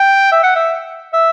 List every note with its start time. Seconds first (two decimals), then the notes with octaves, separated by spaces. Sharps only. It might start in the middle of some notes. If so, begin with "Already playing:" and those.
Already playing: G5
0.32 E5
0.43 F#5
0.56 E5
1.13 E5